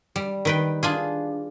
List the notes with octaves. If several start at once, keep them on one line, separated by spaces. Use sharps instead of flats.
G3
D#3 B4 G5
D4 F4 G#4